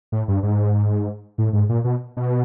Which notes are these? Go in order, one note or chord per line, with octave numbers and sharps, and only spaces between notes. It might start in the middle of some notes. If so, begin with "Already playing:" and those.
A2
G2
G#2
A2
G#2
A#2
B2
B2